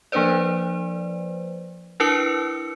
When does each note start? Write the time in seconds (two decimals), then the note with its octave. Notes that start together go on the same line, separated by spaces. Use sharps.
0.12 F3 A#3 D4 B4 C5 D5
2.00 D4 E4 A#4 B4 E6 C#7